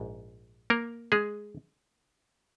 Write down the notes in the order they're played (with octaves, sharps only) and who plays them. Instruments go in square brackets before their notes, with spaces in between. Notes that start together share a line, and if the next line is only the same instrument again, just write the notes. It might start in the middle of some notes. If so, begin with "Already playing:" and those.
Already playing: [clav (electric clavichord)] A#1 G#2
A#3 A#4
G#3 G#4